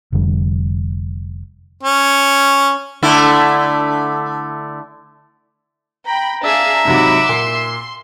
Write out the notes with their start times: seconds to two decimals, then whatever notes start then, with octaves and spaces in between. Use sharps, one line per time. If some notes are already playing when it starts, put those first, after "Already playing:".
0.12 F1 F2 D3 G3
1.83 C#4
3.03 D3 A3 E4
6.07 G5 A#5 B5
6.45 D4 G#4 E5 F5
6.85 G#2 C3 F#3 F#5 B5 D6
7.29 A#2 C6